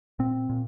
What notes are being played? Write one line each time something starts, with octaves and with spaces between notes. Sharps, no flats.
A#2 C4
A#2